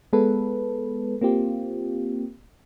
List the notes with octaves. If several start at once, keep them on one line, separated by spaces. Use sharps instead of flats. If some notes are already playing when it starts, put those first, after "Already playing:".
G#3 B3 A4 B4
A#3 C4 F4 G4